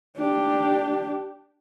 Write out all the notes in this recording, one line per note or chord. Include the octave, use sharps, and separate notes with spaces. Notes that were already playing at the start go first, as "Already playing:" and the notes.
D4 G4